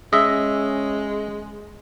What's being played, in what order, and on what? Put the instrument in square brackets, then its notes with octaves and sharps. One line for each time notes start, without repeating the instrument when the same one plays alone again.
[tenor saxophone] G#3 [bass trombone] C#4 [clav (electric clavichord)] D#5 E5